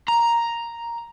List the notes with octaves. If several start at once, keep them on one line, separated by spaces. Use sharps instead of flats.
A#5